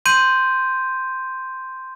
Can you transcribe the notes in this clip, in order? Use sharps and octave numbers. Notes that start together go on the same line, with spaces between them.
C6 G6 D#7